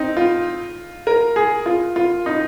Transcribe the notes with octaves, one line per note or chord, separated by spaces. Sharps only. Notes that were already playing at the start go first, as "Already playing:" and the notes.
Already playing: C4 D#4
F4
A#4
G#4
F4
F4
D#4